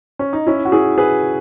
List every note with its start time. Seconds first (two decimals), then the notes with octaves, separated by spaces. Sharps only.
0.19 C#4
0.33 D#4
0.47 C#4 E4
0.65 F#4
0.72 E4 G#4
0.98 G#4 B4